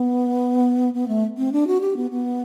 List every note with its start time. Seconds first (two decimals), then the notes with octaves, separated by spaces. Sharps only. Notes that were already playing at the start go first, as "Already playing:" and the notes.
Already playing: B3
0.94 B3
1.08 A3
1.38 C4
1.52 D4
1.67 F#4
1.81 G4
1.96 B3
2.11 B3